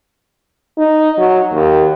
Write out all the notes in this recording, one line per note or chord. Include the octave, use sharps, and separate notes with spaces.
D#4
F#3
D#2